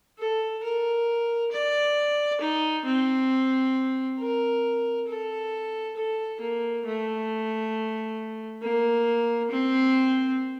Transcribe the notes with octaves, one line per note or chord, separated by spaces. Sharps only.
A4
A#4
D5
D#4
C4
A#4
A4
A4
A#3
A3
A#3
C4